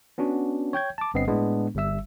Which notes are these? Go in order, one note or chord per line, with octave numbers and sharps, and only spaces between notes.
B3 C#4 D4 F#4
C#5 G5 G6 G#6
A5 D6
G1 G2 B3 C4 D#5 C7
A2 G#3 B3 D4
G1 G3 E5 E6